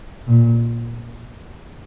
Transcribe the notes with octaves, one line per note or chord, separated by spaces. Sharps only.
A#2